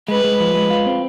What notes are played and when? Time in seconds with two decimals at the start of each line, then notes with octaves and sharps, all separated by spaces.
0.08 G#3 B4
0.24 G#3
0.40 F3
0.55 G#3
0.70 F4
0.86 C4